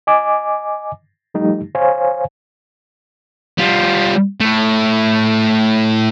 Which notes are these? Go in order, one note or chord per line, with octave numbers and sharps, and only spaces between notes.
D#5 G#5 D6
F3 G3 A3 D#4 G4
C5 C#5 F5 G#5
G3 F4
A2 A3